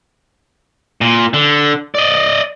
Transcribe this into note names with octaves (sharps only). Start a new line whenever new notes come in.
A#2
D3
D5 D#5